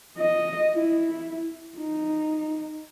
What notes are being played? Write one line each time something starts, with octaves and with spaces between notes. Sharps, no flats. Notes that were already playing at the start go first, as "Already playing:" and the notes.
D#5
E4
D#4